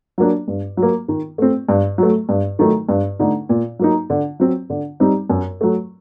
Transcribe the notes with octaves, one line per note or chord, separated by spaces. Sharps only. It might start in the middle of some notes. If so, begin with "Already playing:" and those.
F#3 A#3 D4
G2
F#3
A#3
D#3
A3 C4
G2
F#3 A3
G2
D#3 F#3 A3 D#4
G2
D3 A3 D#4
A#2
F#3 A#3 D#4
D3
F#3 C4
D3
G3 C4 D#4
F#2
F#3 A3